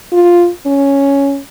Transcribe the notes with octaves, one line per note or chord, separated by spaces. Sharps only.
F4
C#4